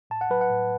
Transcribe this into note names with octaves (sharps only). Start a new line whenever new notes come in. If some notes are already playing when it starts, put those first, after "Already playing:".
A2 A5
F#5
F#3 B4
F#5
A2